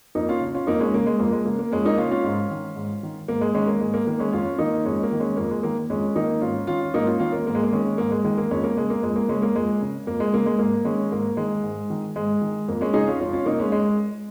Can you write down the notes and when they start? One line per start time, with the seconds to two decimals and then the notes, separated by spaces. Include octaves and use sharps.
0.15 F2 A#3 D#4
0.29 C#4 F4
0.41 C#3
0.55 C#4 F4
0.67 F2 A#3 D#4
0.80 G#3 C#4
0.94 C#3 A#3
1.07 G#3
1.19 F2 A#3
1.32 G#3
1.46 C#3 A#3
1.59 A#3
1.72 F2 G#3 C#4
1.85 A#3 D#4
1.98 C#3 C#4 F4
2.11 C#4 F4
2.24 G#2
2.50 D#3
2.76 G#2
3.03 D#3
3.28 G#2 A#3
3.41 G#3
3.54 D#3 G#3 C#4
3.67 A#3
3.81 G#2 G#3
3.94 A#3
4.07 D#3 A#3
4.19 G#3 C#4
4.33 F2 C#4 F4
4.58 D#3 A#3 D#4
4.85 F2 G#3 C#4
5.03 A#3
5.12 D#3
5.20 G#3 C#4
5.37 F2 A#3
5.51 G#3
5.63 D#3 A#3
5.90 F2 G#3 C#4
6.16 D#3 A#3 D#4
6.41 G#2 C#4 F4
6.67 D#3 C#4 F4
6.94 G#2 A#3 D#4
7.07 C#4 F4
7.20 D#3 C#4 F4
7.32 A#3
7.47 G#2 A#3
7.55 G#3
7.63 A#3
7.72 D#3 G#3 C#4
7.98 G#2 A#3
8.11 G#3
8.24 D#3 G#3
8.38 A#3
8.51 F2 G#3 C#4
8.64 A#3
8.76 C#3 G#3
8.90 A#3
9.03 F2 G#3
9.16 A#3
9.28 C#3 G#3 C#4
9.42 A#3
9.55 F2 G#3
9.82 C#3
10.07 F2 A#3
10.20 G#3
10.33 C#3 A#3
10.46 G#3
10.59 G#2 A#3
10.85 D#3 G#3 C#4
11.11 G#2 A#3
11.37 D#3 G#3
11.63 G#2
11.90 D#3
12.16 G#2 G#3
12.41 D#3
12.68 F2 A#3
12.81 G#3 C#4
12.94 C#3 D#4 G#4
13.07 C#4 F4
13.20 F2 C#4 F4
13.33 C#4 F4
13.46 C#3 A#3 D#4
13.60 G#3 C#4
13.72 G#3